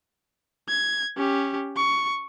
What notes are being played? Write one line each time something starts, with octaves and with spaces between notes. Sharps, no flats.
G#6
C#4 G4
C#6